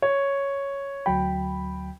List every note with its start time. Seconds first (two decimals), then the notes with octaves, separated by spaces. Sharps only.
0.02 C#5
1.06 D2 F#3 G5 B5